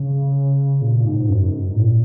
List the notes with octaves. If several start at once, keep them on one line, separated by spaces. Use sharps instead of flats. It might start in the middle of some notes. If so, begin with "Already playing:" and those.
Already playing: C#3
A#2
A#2
G#2
F#2
G#2
A#2